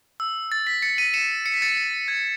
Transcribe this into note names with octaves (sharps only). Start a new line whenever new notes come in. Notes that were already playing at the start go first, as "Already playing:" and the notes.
E6
A6
B6
A6 C#7
B6 D#7
C#7 E7
C#7
B6
A6 C#7
G#6